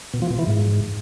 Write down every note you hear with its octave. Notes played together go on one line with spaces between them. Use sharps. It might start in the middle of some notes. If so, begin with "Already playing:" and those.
B2
F3
B2
E3
G#2